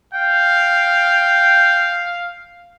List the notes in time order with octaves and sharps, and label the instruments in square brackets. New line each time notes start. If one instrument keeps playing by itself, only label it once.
[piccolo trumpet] F5 [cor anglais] G5